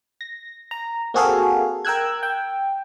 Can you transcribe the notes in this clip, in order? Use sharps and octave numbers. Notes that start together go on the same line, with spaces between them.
A#6
A#5
A#3 C4 F#4 G#4 A4 F5
A#4 G5 E6 F#6 G#6
G5